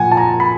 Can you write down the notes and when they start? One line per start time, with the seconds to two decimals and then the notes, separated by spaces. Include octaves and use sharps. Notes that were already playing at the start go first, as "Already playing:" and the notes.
Already playing: A#2 F3 F#5 G#5
0.11 A5
0.17 A#5
0.40 B5